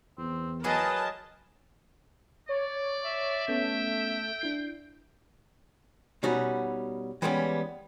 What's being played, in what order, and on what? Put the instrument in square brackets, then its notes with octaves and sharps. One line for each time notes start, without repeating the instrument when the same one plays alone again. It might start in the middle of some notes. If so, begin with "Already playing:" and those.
[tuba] E2 [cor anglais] C4
[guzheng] F#3 G#4 [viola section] A#4 D#5 A5 [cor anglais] B4
[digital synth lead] C#5 [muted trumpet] D5
[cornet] E5
[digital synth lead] A3 [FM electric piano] B3 C#4 [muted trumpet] G5
[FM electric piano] D4 E4 C7
[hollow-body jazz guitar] B2 G3 C#4 D#4 F#4
E3 G3 G#3 A#3 B3 C#4